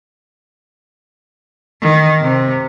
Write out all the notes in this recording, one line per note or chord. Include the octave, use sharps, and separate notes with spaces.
D#3
C3